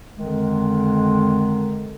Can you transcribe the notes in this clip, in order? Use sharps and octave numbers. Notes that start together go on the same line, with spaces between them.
F2 D3 D#3 G#3